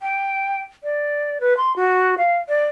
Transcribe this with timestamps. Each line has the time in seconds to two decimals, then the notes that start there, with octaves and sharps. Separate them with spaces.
0.01 G5
0.84 D5
1.41 B4
1.57 C6
1.76 F#4
2.18 F5
2.48 D5